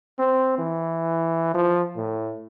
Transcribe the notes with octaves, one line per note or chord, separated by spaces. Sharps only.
C4
E3
F3
A2